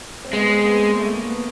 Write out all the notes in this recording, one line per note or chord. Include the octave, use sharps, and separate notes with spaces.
C4
G#3 B3
C4
B3
A#3
A3
A#3
B3